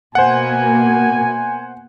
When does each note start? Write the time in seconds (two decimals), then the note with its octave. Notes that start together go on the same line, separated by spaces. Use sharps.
0.15 B2 A#3 C5 F#5 G#5